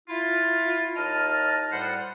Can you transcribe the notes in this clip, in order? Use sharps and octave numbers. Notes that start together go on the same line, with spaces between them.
E4 F4
D#2 D#4 D#5 A5 F6
D2 A2 G3 C5 F#5 B5